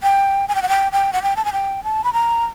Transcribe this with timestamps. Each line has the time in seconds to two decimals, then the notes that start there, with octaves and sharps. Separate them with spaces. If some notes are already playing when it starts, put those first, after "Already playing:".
0.03 G5
0.48 G#5
0.55 G5
0.62 F#5
0.69 G5
0.92 G5
1.13 F#5
1.23 G5
1.36 A5
1.45 G#5
1.53 G5
1.84 A5
2.04 B5
2.13 A#5